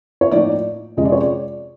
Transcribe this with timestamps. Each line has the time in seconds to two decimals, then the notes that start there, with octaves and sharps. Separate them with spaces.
0.21 C#5
0.31 A2 F3 A#3 D#4 D5
0.97 F2 C3 F3 G#3 C#4 D#5
1.05 D5
1.12 C#5
1.21 D5